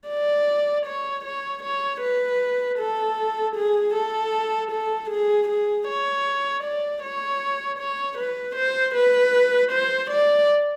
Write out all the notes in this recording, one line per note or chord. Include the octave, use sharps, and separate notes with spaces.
D5
C#5
C#5
C#5
B4
A4
G#4
A4
A4
G#4
G#4
C#5
D5
C#5
C#5
B4
C5
B4
C5
D5